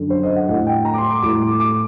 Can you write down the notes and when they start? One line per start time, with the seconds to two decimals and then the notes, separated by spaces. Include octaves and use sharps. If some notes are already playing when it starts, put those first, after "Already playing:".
Already playing: F#2 D3
0.10 C5
0.23 D#5
0.36 F#5
0.48 A2 F#5
0.67 G5
0.85 A#5
0.94 D6
0.98 C6
1.10 D6
1.22 A2 D6
1.42 D6
1.60 D6